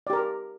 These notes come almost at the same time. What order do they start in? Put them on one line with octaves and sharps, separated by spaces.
D5 G4 A#4